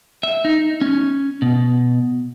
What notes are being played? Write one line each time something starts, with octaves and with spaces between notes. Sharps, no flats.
E5
D#4
C#4
B2